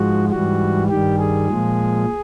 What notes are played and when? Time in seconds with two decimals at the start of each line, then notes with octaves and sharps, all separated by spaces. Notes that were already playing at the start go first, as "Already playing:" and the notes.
Already playing: G#2 F3 G#3 F#4
0.31 G#2 E3 G3 F#4
0.89 G2 D#3 G3 G4
1.18 G#4
1.47 A#2 F3 G#3